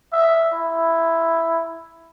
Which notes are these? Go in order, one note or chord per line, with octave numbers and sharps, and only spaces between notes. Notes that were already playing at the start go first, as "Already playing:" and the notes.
E5
E4